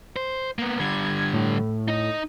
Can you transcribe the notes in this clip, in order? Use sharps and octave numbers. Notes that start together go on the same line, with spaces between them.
C5
A#3 B3
D3 G3 G#6
A2
D#4 D#5